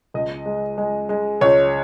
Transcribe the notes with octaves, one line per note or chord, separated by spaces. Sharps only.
C#2 D#5
G#3
G#3
G#3
C#2 C#5